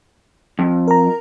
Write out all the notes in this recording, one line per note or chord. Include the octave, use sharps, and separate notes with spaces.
F2
A#4 A#5